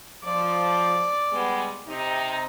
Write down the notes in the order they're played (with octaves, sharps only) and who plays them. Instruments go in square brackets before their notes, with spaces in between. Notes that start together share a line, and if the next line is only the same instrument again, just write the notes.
[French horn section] F3 [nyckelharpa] D5
[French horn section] G3 G#3 B3
C3 D#4